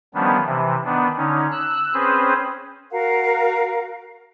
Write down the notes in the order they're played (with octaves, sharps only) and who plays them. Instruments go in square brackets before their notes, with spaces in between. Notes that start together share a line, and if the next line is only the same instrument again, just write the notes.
[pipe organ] D#3 F3 G3 B3 C#4 D4
C3 E3
D#3 B3 D4
D3 C#4 D#4
E6 F#6
C4 C#4 G#4 B4 C5
[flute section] F#4 A#4 F5 F#5